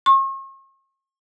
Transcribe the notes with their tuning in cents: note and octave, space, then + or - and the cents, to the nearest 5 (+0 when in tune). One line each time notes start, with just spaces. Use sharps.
C#6 -45